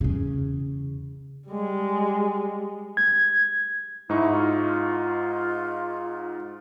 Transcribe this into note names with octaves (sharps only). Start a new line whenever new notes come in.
E2 C#3
G3 G#3
G#6
G#2 D#4 E4 C#6
F4